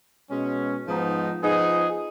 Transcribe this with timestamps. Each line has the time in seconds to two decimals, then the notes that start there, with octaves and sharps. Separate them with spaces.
0.30 B2 G#3 C#4
0.86 G#2 F3 B3 D#4
1.42 F3 B3 D#4 G#4